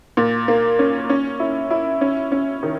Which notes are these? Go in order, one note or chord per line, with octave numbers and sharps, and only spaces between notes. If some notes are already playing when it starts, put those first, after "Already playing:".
A#2
A#3
C#4
C#4
E4
E4
C#4
C#4
D#3